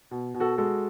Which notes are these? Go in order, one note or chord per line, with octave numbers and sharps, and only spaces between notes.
B2
B2
F#4 A4
G#3 F#4 A4